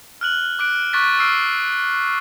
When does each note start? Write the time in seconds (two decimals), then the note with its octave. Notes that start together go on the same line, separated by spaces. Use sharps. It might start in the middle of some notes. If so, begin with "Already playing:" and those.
0.21 F6 F#6 F#7
0.59 D6 F#6 D7
0.93 C#6 D6 F#6 A6 B6
1.19 E6 F6 C7 D7